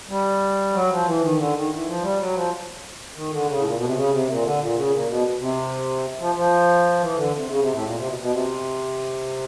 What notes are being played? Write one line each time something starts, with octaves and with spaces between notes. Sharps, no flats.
G3
F#3
F3
E3
D#3
D3
D#3
E3
F3
G3
F#3
F3
D#3
D3
C#3
A2
A#2
B2
C3
C#3
C3
A#2
D3
A#2
C#3
A#2
B2
C3
F3
F3
E3
D3
C3
C#3
C3
A2
A#2
C3
B2
B2
C3